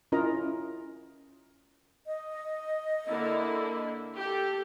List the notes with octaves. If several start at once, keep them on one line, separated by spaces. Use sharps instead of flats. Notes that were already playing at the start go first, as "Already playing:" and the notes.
C#4 E4 F4 A#4 D#5 A#5
D#5
D3 A#3 E4
G4 A4